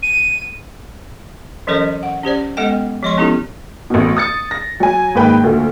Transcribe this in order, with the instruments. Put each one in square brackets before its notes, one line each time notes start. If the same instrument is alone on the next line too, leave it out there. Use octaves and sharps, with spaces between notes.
[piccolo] D#7
[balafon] E3 F#3 C#4 A4 A#4 D#5
F#5
C#4 G4 C5 D5
G#3 B3 A4 D#5 F#5 G5
F3 G#3 C#5 D#5 C6 C#6
B3 C#4 D#4 E4 G4 A4
[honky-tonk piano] A1 B2
D#6 A6 C#7
A#6
F#3 G#5
D#2 G#2 A#3 B4 G5
D2 A#2 A3